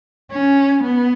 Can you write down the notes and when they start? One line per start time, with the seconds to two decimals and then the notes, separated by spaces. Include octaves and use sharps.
0.31 C#4
0.84 B3